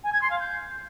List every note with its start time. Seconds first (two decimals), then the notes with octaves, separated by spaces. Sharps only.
0.04 G#5
0.13 G#6
0.22 C6
0.31 F5
0.40 G6